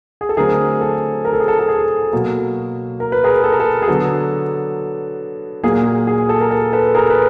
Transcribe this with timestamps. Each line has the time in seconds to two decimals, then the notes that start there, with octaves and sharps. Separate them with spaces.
0.21 G#4
0.29 A4
0.37 D3 F#3 A3 C4 G#4 A#4
0.81 A4
1.25 A#4
1.33 A4
1.40 G#4
1.48 A4
1.59 A4
1.68 G#4
2.13 B2 F#3 A#3
3.00 A#4
3.12 B4
3.24 G#4 A#4
3.44 A4
3.52 A#4
3.60 A4
3.82 G#4
3.88 D3 F#3 B3 A4
5.63 A#2 F#3 A#3 G#4
5.85 G#4
6.07 G#4
6.29 A4
6.40 A#4
6.51 A4
6.73 A4 B4
6.95 G#4 A#4
7.10 B4